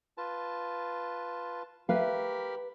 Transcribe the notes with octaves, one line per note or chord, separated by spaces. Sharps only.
F4 B4 A5
G4 A#4 B4 F5 B5